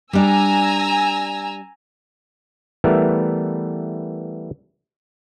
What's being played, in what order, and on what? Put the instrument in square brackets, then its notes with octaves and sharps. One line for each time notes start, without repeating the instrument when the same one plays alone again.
[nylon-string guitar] G3 D4 [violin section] G#5 A#5 E6
[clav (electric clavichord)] E3 G3 A3 B3 A#4 E5